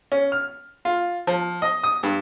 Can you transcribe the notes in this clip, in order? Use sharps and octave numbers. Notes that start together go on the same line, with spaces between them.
C#4
F6
F4
F3
D#5
D#6
G2